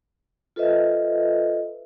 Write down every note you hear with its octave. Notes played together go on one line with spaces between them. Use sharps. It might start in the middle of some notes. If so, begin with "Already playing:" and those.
F4 A4 B4 C5 D#5 E5